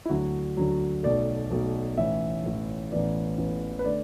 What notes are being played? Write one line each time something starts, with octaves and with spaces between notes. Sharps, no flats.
E4
D2 D3 F#3 F#4
D2 D3 F#3
B1 B2 A3 D5
B1 B2 A3
A1 A2 E3 E5
A1 A2 E3
A1 A2 E3 B3 D5
A1 A2 E3 B3
B4
D3 A3 D5